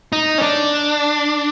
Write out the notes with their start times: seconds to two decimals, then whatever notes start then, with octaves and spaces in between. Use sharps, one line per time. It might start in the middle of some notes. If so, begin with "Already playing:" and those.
0.12 D#4
0.38 C#4
0.42 D4